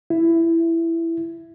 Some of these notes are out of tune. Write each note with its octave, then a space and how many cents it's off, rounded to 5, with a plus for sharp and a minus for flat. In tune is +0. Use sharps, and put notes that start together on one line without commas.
E4 +10